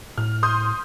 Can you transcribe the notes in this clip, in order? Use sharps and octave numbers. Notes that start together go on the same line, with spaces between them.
A2 F6
C6 D#6 G6